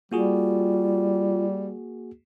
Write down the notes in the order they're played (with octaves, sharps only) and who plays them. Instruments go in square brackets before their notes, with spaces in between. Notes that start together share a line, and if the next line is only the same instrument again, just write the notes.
[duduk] G3 [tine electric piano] A#3 F#4 G#4 [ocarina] F4